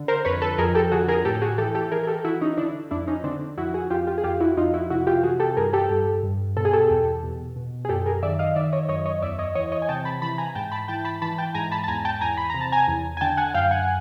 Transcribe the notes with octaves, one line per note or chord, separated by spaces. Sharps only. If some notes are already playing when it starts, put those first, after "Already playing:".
Already playing: D3
A#4 C5
F2 B4 C#5
A4 B4
F2 G#4 A#4
G4 A4
D3 F#4 G#4
G#4 A#4
A2 G4 A4
F#4 G#4
E3 G4 A4
G4 A4
E3 G#4 A#4
A#4
G4 A4
E3 E4 F#4
C#4 D#4
D3 D4 E4
F2 D4 E4
C#4 D#4
D3 C4 D4
F2 E4 F#4
F#4 G#4
F2 F4 G4
F4 G4
G#4
F2 F4 G4
E4 F#4
F2 D#4 F4
E4 F#4
C3 E4 F#4
F4 G4
E3 F#4 G#4
G4 A4
G2 G#4 A#4
G4 A4
G2
G2
B2 A4
G#4
G4 A4
E2
B2
B2
G#4
F#2 G4 A4
G#4 A#4
D#3 D5 E5
D#5 F5
D#3 D5 E5
C#5 D#5
F#2 C#5 D#5
C#5 D#5
E2 D5 E5
C#5 D#5
E3 C#5 D#5
C#5 D#5
G#5
C3 G5 A5
A5 B5
E3 A5 B5
G#5 A#5
G#2 G5 A5
A5 B5
E3 G5 A5
A5 B5
E3 A5 B5
G5 A5
G#2 G#5 A#5
A5 B5
A5
E2 G#5 A#5
G5 A5
E2 G#5 A#5
B5
C3 A#5
A5
G#5 A#5
E2
G#5
D3 G5 A5
F#5 G#5
F#2 F5 G5
F#5 G#5